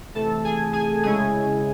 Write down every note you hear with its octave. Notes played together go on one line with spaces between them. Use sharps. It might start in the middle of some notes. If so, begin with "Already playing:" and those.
C3 E3 A3 A4 A5
G#4 G#5
G#4 G#5
C#3 G#3 C#4 E4 G#4 G#5